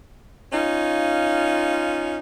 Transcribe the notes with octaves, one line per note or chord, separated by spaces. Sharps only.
C#4 D#4 F4